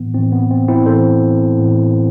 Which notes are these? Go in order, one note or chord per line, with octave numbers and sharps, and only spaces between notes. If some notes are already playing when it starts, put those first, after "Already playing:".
Already playing: A2 E3 B3
A2 E3 C4
B3
C4
C4 E4
A2 E3 A4 C5
A2 E3